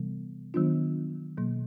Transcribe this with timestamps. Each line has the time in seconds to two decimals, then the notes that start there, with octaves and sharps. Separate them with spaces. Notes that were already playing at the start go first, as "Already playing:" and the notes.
Already playing: C3 E3 G3 B3
0.54 D#3 F#3 B3 D4 F4
1.38 B2 F#3 A#3